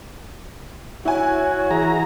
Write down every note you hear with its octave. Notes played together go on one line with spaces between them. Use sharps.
E4 F#4 C#5 G#5
E3 G#4 A#5